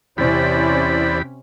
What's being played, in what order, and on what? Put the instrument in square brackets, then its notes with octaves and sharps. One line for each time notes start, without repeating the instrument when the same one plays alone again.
[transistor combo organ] E2 G4 B5 [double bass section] C3 C#4 [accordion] E4 C5 D5